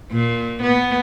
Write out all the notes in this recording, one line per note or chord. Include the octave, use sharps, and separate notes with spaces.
A#2
B3